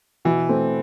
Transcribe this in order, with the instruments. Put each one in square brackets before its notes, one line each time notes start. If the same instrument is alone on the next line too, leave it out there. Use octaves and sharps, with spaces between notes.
[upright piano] B2 [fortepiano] E3
[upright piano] A3 C4